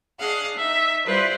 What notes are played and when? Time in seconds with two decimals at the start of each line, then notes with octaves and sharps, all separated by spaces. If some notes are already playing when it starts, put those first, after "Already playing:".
0.19 D4 G#4 D#5 F5 F#5
0.56 D#4 E5
1.05 G3 E4 F4 B4 C5 D5